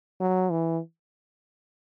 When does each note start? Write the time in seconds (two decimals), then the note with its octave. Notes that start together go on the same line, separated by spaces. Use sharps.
0.20 F#3
0.51 E3